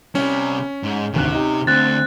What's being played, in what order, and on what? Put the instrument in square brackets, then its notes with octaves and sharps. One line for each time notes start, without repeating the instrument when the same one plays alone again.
[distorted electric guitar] C3 G3 [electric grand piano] C#4
[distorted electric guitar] G#2
[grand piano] G#1 D2 F#6 [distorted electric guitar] C3
[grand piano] D#4 G4
[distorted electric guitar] D2 [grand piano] C4 [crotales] F#6 A6